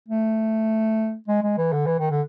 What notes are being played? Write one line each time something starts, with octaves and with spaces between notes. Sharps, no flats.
A3
G#3
G#3
E3
D3
E3
D#3
D3